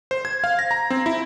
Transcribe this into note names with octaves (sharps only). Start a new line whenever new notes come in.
C5
G#6
F5
A#6
A#5
C4
E4